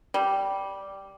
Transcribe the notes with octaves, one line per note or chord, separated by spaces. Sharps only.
G3